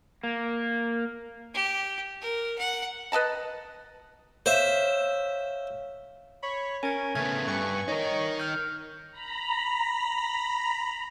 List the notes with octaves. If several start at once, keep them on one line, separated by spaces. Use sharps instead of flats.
A#3
G4
A#4
F#5
B4 D#5 A5 A#5
C5 C#5 E5 F5
C#5 B5
C#4 A#4 G#5 G#6
C#3 A3 B3 G#6
G2 B4 G#5 C#6
D#4 A#4 C#5 D#5
F6 G6
A#5 B5